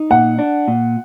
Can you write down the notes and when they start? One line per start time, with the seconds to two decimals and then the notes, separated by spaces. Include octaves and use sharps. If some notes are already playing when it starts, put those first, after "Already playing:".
Already playing: D#4
0.10 A#2 F#5
0.39 D4
0.68 A#2